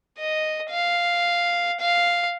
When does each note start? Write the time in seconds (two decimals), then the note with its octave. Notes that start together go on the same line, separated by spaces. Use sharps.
0.18 D#5
0.70 F5
1.80 F5